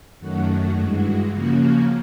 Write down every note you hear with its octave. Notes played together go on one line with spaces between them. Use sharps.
F#2 D#3 F#3 A3 F#4
G2 E3 G#3
C#3 F3 A#3 C#4 F#4